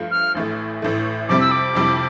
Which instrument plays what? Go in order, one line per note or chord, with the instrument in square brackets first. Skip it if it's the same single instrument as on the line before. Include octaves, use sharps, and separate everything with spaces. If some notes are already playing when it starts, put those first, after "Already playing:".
Already playing: [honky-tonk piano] G2 F3 A3
[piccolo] F6
[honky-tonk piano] A1 A2 E3 A3
A1 A2 E3 A3
[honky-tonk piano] F2 C3 G3 C4 E4 [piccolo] D6
[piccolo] E6
D6
[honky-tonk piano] F2 C3 G3 C4 E4